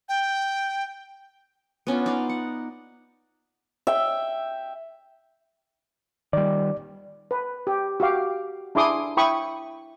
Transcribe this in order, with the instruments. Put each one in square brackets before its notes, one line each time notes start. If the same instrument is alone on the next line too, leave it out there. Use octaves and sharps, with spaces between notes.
[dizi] G5
[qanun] B3 C#4 D4 F4
D#4 D5 F5
F#5
[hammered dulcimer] E5 G5
[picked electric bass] D#3 G3 [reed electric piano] D5
[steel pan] B4
G4
F#4 G4 F5 D6
D4 E4 G#4 C6 D6 D#6
E4 G5 B5 C#6 D#6